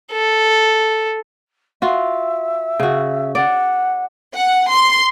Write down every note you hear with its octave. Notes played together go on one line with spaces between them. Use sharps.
A4
F4 F#4 E5
C#3 F#4
D5 F#5
F#5
C6